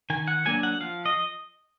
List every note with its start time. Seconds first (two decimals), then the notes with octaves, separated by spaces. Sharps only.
0.10 D#3 G#5
0.28 F#5
0.45 F#3 A#3 D4 G#5
0.63 F#5
0.81 F3 F5
1.06 D#5